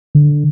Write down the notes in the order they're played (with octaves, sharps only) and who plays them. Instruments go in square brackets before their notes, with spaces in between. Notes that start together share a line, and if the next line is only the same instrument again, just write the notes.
[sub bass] D3